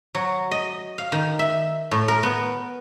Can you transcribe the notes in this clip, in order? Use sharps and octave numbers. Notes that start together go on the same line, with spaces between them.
F#3
D#5
F5
D#3
E5
A2
A#4
B3